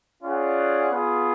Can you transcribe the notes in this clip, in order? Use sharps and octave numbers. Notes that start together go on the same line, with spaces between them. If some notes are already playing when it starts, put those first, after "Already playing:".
C#4 F4 G#4 D5 F#5
B3 F4 G#4